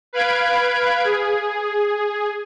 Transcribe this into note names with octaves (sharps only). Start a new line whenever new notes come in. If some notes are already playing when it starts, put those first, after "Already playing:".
B4 F5 B5 G#6 D7
G#4